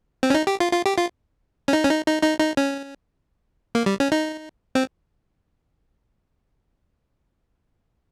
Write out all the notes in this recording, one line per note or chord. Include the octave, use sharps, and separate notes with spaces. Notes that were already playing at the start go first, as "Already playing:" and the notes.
C4
C#4
D#4
G4
F4
F4
G4
F4
C#4
D#4
C#4
D#4
D#4
D#4
D#4
C#4
A#3
G3
C#4
D#4
C4